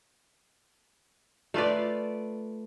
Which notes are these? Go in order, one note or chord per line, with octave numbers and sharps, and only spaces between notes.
A3 F4 B4 D5